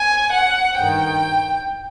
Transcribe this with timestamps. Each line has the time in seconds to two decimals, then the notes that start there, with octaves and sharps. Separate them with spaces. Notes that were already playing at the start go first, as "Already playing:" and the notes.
Already playing: G#5
0.31 F#5
0.77 G2 D#3 G5